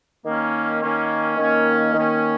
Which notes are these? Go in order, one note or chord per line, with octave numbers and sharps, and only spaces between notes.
D#3 A#3 C#4
D#3 A#3 C#4
D#3 A#3 C#4
D#3 A#3 C#4